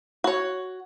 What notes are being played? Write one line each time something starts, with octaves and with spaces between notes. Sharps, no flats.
F#4 C#5